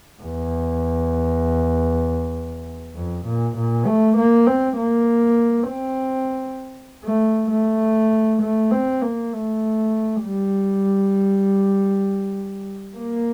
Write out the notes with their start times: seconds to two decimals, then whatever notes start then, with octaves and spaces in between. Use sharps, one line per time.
0.22 E2
2.95 F2
3.25 A#2
3.56 A#2
3.86 A3
4.17 A#3
4.47 C4
4.77 A#3
5.68 C4
7.04 A3
7.50 A3
8.41 A3
8.72 C4
9.02 A#3
9.33 A3
10.23 G3
12.96 A#3